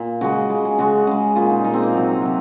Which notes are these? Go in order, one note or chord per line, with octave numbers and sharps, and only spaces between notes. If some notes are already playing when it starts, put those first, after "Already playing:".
Already playing: A#2
C#3 G#3 F#4
C#3 G#3
G#4
C#3 G#3 F#4
C#3 G#3
A#2 G#3 F4
D#4
A#2 G#3 D#4
C4
A#3
C3 F#3
C3 F#3